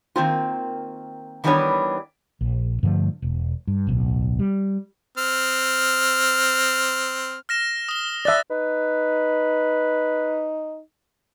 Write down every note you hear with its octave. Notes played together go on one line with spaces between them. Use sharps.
D#3 A#3 C4 F4
D#3 E3 G3 B3 D4 C#5
A#1
G2 D3 F3 A3
E1
G2
D1 B1
G3
C4 F6
F6 A#6 E7
D#6 G7
D5 E5 F#6 A6
D#4 B4